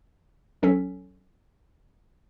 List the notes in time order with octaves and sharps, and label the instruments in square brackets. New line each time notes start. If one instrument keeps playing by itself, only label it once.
[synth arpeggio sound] B1 F#3 C#4 A4 B6